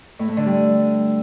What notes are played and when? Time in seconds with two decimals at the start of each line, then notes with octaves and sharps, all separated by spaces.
0.19 A2
0.28 A3
0.37 D3
0.46 G3